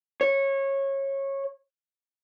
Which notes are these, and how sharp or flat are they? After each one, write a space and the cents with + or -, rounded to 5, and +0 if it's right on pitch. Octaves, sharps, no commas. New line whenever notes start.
C#5 -20